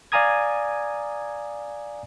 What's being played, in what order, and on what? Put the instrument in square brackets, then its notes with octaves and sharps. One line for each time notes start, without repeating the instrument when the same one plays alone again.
[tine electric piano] D5 F5 G#5 A#5 D#6 G#6